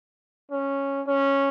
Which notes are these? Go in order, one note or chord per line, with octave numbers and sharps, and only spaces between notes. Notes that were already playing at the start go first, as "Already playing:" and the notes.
C#4
C#4